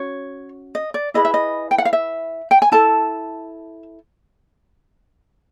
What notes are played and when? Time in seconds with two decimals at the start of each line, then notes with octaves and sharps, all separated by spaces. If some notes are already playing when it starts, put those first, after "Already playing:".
Already playing: C#4 F#4 C#5
0.75 D#5
0.94 D5
1.14 E4 G#4 B4 D#5
1.25 E5
1.34 D#5
1.71 G5
1.78 F#5
1.85 F5
1.93 E5
2.51 G5
2.62 G#5
2.72 E4 A4 A5